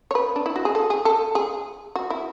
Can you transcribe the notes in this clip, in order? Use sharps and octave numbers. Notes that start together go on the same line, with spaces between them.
C#5
B4
D4
E4
F#4
G#4
A4
G#4
A4
G#4
F#4
E4